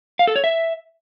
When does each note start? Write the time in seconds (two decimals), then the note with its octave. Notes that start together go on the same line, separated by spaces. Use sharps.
0.19 F5
0.27 A4
0.36 C#5
0.44 E5